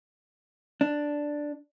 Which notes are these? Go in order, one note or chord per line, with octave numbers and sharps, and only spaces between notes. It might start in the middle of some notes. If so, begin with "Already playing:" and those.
D4